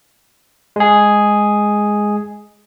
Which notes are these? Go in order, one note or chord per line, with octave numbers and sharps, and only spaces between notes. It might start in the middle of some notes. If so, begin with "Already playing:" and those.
G#3 G#4